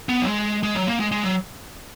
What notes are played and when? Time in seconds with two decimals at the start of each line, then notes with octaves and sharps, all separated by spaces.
0.09 B3
0.22 F#3
0.26 G#3
0.63 G#3
0.75 F#3
0.87 A#3
1.00 G#3
1.12 G#3
1.23 F#3